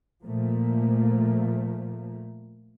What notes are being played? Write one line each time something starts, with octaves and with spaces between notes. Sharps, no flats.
A#2 F3 A3 A#3